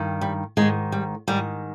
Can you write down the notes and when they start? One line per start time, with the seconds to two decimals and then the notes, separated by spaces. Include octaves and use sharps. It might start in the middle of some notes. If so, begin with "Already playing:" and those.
Already playing: G2 D#3
0.21 G3
0.57 G#2 D#3 G#3
0.92 G3
1.28 G#2 D#3 G3